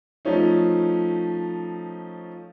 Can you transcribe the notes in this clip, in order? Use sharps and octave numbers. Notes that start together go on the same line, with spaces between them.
F3 A3 C#4 D#4